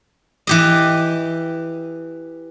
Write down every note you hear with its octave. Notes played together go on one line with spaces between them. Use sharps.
E3 G4 D#5